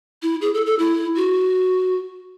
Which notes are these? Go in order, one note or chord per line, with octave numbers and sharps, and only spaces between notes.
E4
G#4
A4
A4
E4
F#4